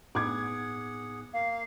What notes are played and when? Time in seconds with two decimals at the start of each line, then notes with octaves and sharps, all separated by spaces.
0.15 A2 B3 D#4 G#4 F#5 D6 G#6
1.33 A#3 F5